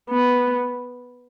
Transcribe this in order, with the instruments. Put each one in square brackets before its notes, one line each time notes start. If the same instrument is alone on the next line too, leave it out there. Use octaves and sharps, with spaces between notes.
[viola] B3